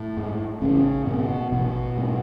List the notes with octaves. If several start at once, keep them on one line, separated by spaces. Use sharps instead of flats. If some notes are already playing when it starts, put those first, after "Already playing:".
Already playing: A2 A3
G#2
A1 C#3 C#4
G#2 B2 B3
A1 B2 B3
G#2